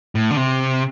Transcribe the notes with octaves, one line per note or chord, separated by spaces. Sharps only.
A2
D3
C3